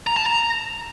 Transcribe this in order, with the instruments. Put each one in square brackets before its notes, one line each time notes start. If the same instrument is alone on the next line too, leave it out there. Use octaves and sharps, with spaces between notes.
[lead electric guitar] A#5
A5
A#5